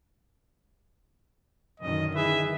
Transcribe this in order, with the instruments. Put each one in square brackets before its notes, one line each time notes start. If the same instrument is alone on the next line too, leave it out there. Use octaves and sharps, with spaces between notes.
[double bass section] F#2 D3 D#3 [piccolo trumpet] D#5
[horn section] E4 G#4 B4 [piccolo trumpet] E5